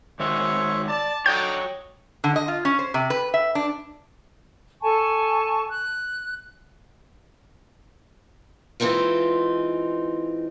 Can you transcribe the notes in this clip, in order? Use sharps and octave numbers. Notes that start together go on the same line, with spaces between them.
D#3 G#3 F#4 C5 C#5 E5
D5 A5
D3 D4 D#4 F#4 C#5 G5 G6
D3
D#5
F4
C#4
C5
C3
B4
E5
D4
A4 G#5 A5 C#6
F#6
E3 G#3 C4 D#4 F4